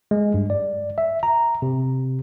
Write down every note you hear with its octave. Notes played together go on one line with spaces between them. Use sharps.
G#3
G2
D5
E5
A#5
C3